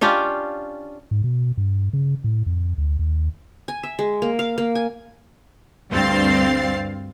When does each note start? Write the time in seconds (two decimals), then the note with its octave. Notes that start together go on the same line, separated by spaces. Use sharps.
0.01 C#4 D4 F4 G4
1.11 G#2
1.24 B2
1.58 G2
1.93 C#3
2.24 A2
2.46 F2
2.78 D2
2.99 D#2
3.68 G#5
3.83 E5
3.99 G#3
4.22 A#3
4.39 F5
4.58 A#3
4.75 G#5
5.92 D2 G2 C4 F5 A6 C7